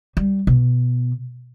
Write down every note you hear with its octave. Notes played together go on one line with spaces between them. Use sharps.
G3
B2